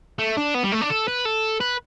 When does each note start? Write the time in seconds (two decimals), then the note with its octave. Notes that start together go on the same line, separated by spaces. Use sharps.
0.19 A3
0.37 D4
0.55 B3
0.64 G3
0.72 A3
0.82 D4
0.90 A4
1.08 B4
1.25 A4
1.61 B4